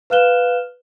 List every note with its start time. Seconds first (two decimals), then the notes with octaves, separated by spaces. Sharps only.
0.10 B4 F5 F6 F#6 E7 G7